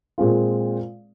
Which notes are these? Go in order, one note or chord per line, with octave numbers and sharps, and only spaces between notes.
A#2 G#3 C4 F4